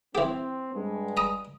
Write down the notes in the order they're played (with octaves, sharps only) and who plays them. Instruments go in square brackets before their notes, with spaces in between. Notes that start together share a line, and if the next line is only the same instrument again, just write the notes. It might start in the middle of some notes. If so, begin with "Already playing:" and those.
[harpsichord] E3 G4 [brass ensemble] C4
[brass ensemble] G2 G#3
[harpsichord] A#5 D#6